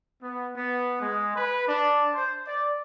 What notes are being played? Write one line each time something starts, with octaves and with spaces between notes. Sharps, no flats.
B3
B3
G#3
B4
D4
C5
D5